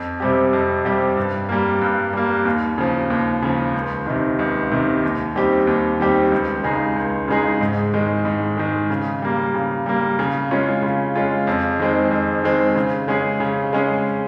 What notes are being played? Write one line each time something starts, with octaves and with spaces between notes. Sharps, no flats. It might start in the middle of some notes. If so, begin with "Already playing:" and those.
Already playing: F2
C3 G3 C4 G4
F2
C3 G3 C4 G4
G2
G3 A#3
G2
G3 A#3
D#2
C#3 F3
D#2
C#3 F3
C#2
C3 D#3
C#2
C3 D#3
D#2
D#3 G3 C4 G4
D#2
D#3 G3 C4 G4
C#2
C#3 G#3 D#4 G#4
C#2
C#3 G#3 D#4 G#4
G#2
D#3 G#3
G#2
D#3 G#3
C#3
G3 A#3
C#3
G3 A#3
C#3
G#3 C#4 F4
C#3
G#3 C#4 F4
F2
D#3 G#3 C4
F2
D#3 G#3 C4
C#3
G#3 C#4 G#4
C#3
G#3 C#4 G#4